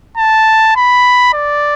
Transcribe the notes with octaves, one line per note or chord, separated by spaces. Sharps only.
A5
B5
D5